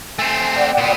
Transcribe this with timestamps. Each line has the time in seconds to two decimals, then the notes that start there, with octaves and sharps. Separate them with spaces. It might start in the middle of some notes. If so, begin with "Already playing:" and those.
0.19 A3 C4 G#5
0.55 D5 F#5 G5
0.78 A#2 B3